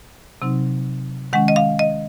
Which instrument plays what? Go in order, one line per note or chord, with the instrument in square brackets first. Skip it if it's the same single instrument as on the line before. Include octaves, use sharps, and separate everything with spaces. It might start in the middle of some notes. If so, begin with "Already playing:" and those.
[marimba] C3 F#3 C4 D#4
D#3 G#3 C#4 F#5
D#5
F5
D#5